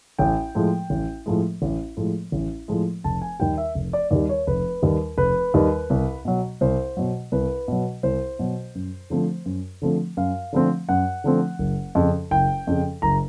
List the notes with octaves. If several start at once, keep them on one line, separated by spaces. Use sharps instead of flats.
A1 G5
A2 F3 G#3
A1
A2 F3 G#3
A1
A2 F3 G#3
A1
A2 F3 G#3
F1 A5
G#5
D#2 D#3 G3 G5
E5
F1
D5
D#2 D#3 G3 D5
C#5
F1 B4
D#2 D#3 G3
F1 B4
D#2 D#3 G3
C2
B2 F#3
C2 C5
B2 F#3
C2 B4
B2 F#3
C2 C5
B2 F#3
F#2
D3 F3 A3 C4
F#2
D3 F3 A3 C4
F#2 F5
D3 F3 A3 C4
F#2 F#5
D3 F3 A3 C4
F#1
F2 C#3
F#1 G5
F2 C#3
F#1 A#5